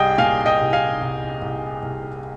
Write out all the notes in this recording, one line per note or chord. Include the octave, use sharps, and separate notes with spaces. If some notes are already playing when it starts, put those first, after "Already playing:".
Already playing: C2 G3 G#4 D#5 G5
A#2 F5 G#5
D#5 G5
C2
F5 G#5
C2
C2
C2